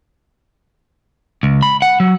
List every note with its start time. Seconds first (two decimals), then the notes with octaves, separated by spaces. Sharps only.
1.43 C#2
1.62 B5
1.82 F#5
2.00 F#3